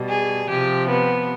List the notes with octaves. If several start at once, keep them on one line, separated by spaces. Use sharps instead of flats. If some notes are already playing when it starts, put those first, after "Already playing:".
Already playing: B2 G3
G#4
C3 F3 G4
B3